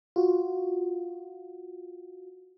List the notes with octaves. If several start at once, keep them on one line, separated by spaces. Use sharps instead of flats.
F4 F#4